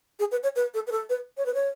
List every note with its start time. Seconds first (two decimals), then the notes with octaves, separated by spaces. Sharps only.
0.19 G#4
0.31 B4
0.43 C#5
0.56 B4
0.74 A4
0.87 B4
0.92 A4
1.09 B4
1.37 C#5
1.46 B4
1.54 C#5